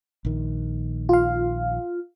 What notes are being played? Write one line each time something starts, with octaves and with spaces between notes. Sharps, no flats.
A#1 D#3
F4 F5